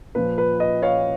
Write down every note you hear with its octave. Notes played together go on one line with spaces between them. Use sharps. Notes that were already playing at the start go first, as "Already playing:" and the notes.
A#2 F3 B4
B4
B4 D#5
C#5 F5